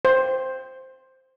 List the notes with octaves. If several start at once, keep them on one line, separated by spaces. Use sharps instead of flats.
C5